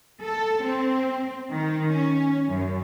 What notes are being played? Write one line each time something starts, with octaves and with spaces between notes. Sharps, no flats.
A4
C4
D#3
C#4
F#2